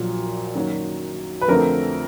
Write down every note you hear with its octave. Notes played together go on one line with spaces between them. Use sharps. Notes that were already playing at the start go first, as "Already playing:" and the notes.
Already playing: A#1 A#2 F#3 A#3
F#2 D#3 F#3 A#3
B4
F2 D3 F3 A3 C4 A#4